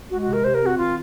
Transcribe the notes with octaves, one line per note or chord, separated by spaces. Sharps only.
G#3 F#4
F#4
C3
A#4
C3 C5
A#4
C4
F#4
D#3 F4